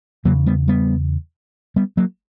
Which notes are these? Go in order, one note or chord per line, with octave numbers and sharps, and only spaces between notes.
E2 C#3 F#3 A#3
G3 B3
G3 B3
G3 B3
F#3 A#3